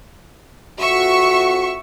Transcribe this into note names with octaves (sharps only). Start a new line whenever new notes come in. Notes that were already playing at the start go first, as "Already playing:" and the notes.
F2 F#4 E5 C#6